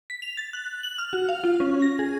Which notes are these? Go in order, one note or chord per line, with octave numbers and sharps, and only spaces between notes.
B6
F7
A6
F#6
F#7
F6
F#4
F5
F4
C#4
A#6
G#4